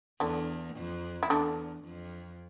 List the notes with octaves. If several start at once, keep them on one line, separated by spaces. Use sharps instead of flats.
E2 D3 D4
F2
E4
E2 D3 D4
F2